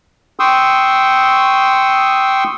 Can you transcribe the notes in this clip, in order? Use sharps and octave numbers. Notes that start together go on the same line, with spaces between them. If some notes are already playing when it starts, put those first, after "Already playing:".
G5 C6 C#6 D#6 E6